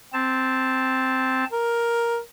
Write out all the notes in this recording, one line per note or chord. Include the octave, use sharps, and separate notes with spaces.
C4 A5
A#4